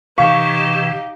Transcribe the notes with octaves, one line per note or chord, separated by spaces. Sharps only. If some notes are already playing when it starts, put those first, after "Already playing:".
C3 E3 D#4 G4 F5 C#6